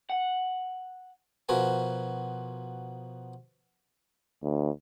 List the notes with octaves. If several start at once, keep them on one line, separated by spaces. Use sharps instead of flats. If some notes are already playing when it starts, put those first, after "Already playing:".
F#5
B2 F3 F#4 A#4 B4 G#5
D2